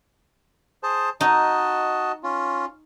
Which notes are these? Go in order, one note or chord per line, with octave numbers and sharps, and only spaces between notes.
G#4 C5 A5
D#4 F#4 D#5 A5
C#4 F4